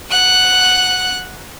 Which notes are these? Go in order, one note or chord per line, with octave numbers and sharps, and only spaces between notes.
F#5 F#6